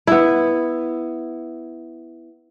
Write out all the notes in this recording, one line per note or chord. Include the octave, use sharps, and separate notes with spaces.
B3 E4